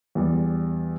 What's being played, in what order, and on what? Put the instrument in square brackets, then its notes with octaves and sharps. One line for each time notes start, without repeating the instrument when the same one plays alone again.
[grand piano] E2 G3